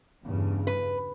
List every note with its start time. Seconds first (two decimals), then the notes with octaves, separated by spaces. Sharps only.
0.24 E2 G2 C#3
0.67 B4